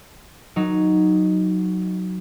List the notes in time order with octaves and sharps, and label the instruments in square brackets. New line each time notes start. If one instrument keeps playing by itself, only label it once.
[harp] F#3 D#4